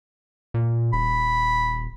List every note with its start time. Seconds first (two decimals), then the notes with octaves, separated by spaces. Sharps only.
0.54 A#2
0.93 D#1 B5